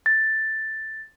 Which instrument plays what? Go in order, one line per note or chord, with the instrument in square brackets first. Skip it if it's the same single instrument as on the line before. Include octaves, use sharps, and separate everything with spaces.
[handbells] A6